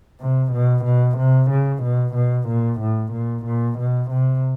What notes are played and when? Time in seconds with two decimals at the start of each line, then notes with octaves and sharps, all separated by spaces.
0.20 C3
0.52 B2
0.84 B2
1.18 C3
1.50 C#3
1.83 B2
2.15 B2
2.48 A#2
2.80 A2
3.12 A#2
3.45 A#2
3.78 B2
4.11 C3